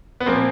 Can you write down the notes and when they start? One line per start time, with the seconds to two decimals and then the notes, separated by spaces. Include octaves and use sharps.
0.20 B3
0.26 A#2 F3 A#3 C4